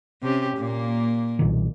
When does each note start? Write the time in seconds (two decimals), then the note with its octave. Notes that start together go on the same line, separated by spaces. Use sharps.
0.22 C3 C#4 G4
0.57 A#2 A#3
1.39 B1 A#2 D#3